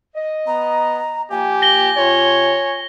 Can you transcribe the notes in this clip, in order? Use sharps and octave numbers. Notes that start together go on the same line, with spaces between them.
D#5
B3 A#5
F3 A#3 G4 G#5
A#6 G7
C3 F4 C#5